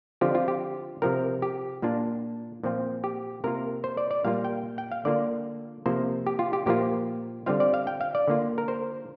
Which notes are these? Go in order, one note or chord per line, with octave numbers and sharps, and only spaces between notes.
D3 F3 C4 F4 G4
F4
G4
C3 F3 C4 A#4
G4
A#2 A#3 D4 F4
A#2 F3 C4 F4
G4
C3 A#3 F4 A#4
C5
D5
D5
A#2 G3 A#3 F4 F5
G5
G5
F5
D3 A#3 F4 D5
C3 F3 A#3 C5
G4
F4
G4
A#2 F3 A#3 F4 G4
D3 G3 C4 F4 F5
D5
F5
G5
F5
D5
D3 A#3 F4
A#4
C5